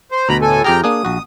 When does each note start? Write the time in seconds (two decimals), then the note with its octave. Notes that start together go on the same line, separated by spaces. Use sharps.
0.11 C5
0.29 D2 B2 A#5 B5
0.42 A2 A4 G#5
0.64 F2 G4 G#4 G5 A#5 F6
0.84 A#3 D4 G#4 D#6
1.05 A#1 F#4